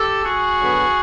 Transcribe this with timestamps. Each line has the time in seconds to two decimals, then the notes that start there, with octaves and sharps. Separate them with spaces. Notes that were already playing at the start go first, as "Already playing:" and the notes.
Already playing: G4 A4
0.24 F#4 G#4
0.59 D3 F#3 B3